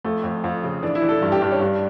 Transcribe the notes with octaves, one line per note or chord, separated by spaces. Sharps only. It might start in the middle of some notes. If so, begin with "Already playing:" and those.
F2 A3
F2
F2
C#3
E3 D4
E4
E3
A4
G2
G4
G2 D4
C#4
G2 D4